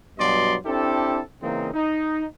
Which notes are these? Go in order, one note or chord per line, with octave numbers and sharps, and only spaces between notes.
G2 B2 F#3 D5 D#5 C6
C4 D4 E4 G4 A4
C#3 E3 A#3 C4 D#4
D#4